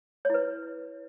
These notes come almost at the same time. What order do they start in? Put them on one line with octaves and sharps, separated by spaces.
C#5 E4 B4